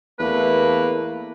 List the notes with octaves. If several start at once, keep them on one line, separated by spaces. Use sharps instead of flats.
E2 A3 A#3 B4